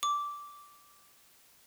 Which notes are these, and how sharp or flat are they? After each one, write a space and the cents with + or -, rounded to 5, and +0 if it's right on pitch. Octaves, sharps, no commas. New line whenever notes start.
D6 -10